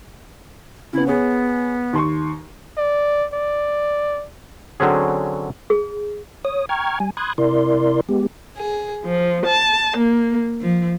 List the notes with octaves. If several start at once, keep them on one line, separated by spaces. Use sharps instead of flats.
C#3 B3 E4
B3 G#4 C#5
D#2 C6 C#6
D5
D5
D3 F#3 C4 C#4 G#4
G#4
C#5 D#6
G5 A#5 C#6 F6 G#6
G3 G#5
B5 C6 D#6 F#6 G#6
C3 E4 A#4 D5 C6
G#3 B3 G4
G#4
F3
A5
A#3
F3